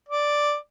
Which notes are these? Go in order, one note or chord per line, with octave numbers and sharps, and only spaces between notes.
D5